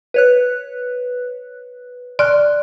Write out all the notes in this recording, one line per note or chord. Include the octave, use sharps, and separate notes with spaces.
B4 C#5 F#6
D5 C6 F6 F#6